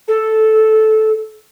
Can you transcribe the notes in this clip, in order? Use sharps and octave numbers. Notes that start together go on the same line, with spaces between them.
A4